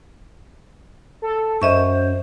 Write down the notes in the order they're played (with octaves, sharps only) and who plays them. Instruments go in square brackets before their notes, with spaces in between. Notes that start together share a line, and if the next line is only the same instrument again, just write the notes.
[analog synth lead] A4
[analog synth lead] F#2 [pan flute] C5 [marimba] D#5 E5 C#6